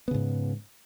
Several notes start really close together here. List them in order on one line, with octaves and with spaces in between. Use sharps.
B3 C#3 G#2